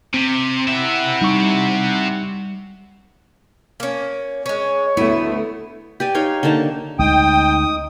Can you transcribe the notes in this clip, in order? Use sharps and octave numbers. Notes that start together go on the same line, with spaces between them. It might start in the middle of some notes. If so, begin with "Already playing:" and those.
C3 C4
C3 E4 E5 F#5
G3 D#4 C#6
A#3 C#4
G#3 C#4 C#5
D2 A3 B3 E4 E5
G4 D5 G#5
D#4 C#5 F5 G5
D3 A#3 D#4 A5
D2 G#3 C#4 D#4 G5 D#6